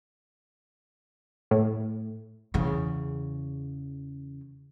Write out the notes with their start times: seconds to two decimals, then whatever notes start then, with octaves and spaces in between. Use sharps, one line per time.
1.51 A2
2.54 E2 C#3